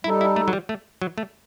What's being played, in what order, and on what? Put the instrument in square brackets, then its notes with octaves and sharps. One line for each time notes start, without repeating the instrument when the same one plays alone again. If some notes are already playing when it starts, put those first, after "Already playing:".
[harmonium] G3 D#4 A4 [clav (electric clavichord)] E4
[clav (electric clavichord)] E4
A3
F#3
G3
A3
F#3
A3